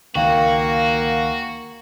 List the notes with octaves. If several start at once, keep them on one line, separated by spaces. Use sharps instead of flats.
C#2 D#3 A#3 F#4 F5 G5